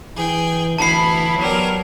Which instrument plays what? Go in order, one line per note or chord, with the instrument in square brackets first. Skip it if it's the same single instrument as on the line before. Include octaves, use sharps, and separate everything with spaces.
[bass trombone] E3 [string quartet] G#4 G5
[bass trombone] D2 [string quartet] E3 B3 E4 [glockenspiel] A5 C7
[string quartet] F#3 G3 A#4 [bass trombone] B3